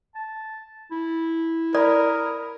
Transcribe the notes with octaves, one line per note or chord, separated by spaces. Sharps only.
A5
E4
A#4 D5 B5 D#6